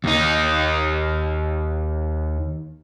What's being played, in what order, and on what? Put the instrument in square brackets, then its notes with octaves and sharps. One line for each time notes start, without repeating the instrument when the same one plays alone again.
[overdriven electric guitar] D#2 D#4